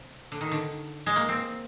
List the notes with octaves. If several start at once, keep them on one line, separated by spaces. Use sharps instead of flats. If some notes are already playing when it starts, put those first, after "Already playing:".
Already playing: C3
D3
D#3
D3
G#3
A#3
C4